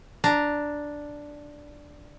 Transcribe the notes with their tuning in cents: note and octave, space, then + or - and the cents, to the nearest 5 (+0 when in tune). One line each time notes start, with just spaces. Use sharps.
D4 +0 A#5 +0